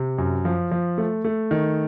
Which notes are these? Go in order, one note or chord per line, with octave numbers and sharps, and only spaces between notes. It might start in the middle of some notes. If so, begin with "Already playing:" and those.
Already playing: C3
F#2
F3
F3
A3
A3
D#3